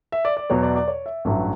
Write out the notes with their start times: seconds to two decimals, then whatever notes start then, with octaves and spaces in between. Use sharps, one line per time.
0.12 E5
0.25 D5
0.37 D5
0.50 E2 B2 F#3 C#5
0.63 D5
0.75 D5
0.88 C#5
1.06 E5
1.25 A1 G2 F#3 E5